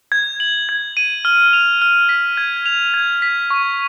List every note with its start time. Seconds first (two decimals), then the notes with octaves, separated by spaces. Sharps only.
0.12 G#6
0.40 F#7
0.69 G#6
0.97 D#7
1.25 F6
1.53 F7
1.82 F6
2.09 B6
2.37 G#6
2.66 F7
2.94 G#6
3.22 B6
3.50 C#6